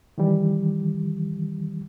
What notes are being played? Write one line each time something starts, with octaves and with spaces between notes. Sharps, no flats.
D#3 E3 G3